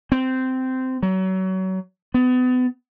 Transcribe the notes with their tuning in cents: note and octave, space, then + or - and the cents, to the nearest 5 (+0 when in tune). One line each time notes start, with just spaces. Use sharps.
C4 -15
F#3 +30
B3 +35